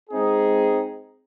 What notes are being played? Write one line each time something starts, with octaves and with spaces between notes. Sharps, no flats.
G#3 C4 D#4 G#4